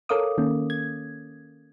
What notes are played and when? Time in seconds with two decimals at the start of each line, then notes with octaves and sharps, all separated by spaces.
0.09 A4 A#4 C#5 F5 D6 D#6
0.38 D#3 A#3 C#4
0.70 G#6